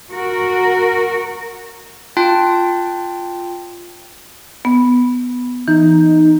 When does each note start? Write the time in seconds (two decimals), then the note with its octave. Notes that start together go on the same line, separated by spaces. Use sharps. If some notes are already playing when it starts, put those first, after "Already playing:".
0.13 F#4 A#4
2.17 F4 G5 A5
4.65 B3
5.68 E3 D#4